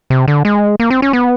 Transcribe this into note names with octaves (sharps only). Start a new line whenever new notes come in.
C3
D3
G#3
A#3
C4
C#4
B3